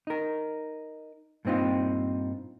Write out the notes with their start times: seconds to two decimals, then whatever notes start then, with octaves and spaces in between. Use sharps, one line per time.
0.07 D#4 A#4
1.45 G2 A#2 C4 D#4 F4